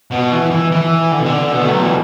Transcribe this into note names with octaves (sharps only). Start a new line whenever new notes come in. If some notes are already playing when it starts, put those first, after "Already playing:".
B2
E3
E3
E3
D3
B2
D3
B2
A3
F#3
E3